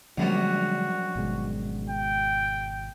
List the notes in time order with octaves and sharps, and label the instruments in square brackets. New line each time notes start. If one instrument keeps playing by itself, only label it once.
[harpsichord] A#1 F#2 G3 [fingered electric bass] D3 G#3 [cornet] F#4
[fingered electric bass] G#1 B2 G#3
[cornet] G5